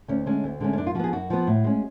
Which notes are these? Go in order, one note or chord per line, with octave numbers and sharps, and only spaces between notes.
D2 C#4
D3 G#3 C#4
D2
D3 G#3 C#4
C#4
F#2 D4
F4
F3 B3 F#4 G#4
F#2 F#4
F3 B3
A2
G#3 C#4